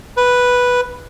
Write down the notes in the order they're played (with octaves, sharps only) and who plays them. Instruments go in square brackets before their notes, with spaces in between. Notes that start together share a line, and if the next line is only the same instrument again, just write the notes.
[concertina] B4